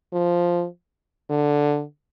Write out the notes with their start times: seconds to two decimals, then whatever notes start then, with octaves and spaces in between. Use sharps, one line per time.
0.13 F3
1.30 D3